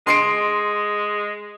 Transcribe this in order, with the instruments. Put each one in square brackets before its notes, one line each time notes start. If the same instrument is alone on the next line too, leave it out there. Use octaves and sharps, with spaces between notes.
[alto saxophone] G#3 [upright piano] C6 C7 D7